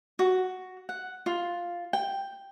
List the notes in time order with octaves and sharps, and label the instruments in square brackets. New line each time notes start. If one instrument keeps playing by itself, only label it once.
[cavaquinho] F#4
F#5
F4
G5